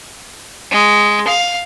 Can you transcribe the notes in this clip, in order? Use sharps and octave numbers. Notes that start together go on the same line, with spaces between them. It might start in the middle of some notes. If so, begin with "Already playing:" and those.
G#3
F5